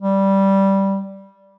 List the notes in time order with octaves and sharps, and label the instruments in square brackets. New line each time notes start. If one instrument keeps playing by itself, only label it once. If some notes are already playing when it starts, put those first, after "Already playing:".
[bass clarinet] G3